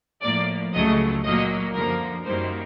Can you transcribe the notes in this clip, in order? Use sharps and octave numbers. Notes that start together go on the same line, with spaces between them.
A2 F3 A#3 D5
C#2 C#3 F#3 A3 D#5
A#2 F#3 A#3 D#5
F#2 D3 F3 A#3 A#4
F#2 D#3 G3 A#3 C5